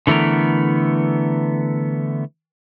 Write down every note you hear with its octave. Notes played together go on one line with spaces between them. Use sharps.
D3 E3 A3 B3 A#4